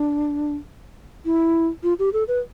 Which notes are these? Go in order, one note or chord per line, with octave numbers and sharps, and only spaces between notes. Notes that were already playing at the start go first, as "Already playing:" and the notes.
Already playing: D4
E4
F4
G4
A4
B4